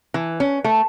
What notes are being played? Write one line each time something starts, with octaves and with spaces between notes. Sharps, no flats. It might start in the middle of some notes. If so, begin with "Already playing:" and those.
E3
C#4
A3